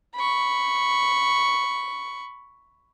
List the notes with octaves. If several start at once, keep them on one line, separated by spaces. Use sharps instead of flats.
B5 C#6